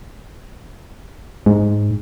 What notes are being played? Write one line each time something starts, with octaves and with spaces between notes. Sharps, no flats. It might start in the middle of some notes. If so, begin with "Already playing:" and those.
G#2